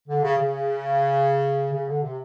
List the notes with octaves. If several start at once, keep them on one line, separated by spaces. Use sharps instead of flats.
D3
C#3
C#3
C#3
D3
C3